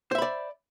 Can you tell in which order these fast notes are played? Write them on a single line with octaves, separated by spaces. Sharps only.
C5 E5 B5 D5